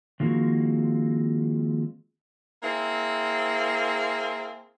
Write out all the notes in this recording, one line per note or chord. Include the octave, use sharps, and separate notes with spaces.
D#3 F3 G#3 A#3 C4 F#4
A#3 C4 E4 G#4